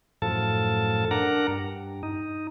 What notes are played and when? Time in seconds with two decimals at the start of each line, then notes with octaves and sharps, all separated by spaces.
0.22 F#2 A2 F3 A4 A5
1.11 D4 A#4 F#5 A#5
1.48 G2
2.03 D#4